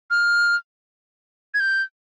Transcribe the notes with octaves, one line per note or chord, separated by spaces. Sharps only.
F6
G#6
G6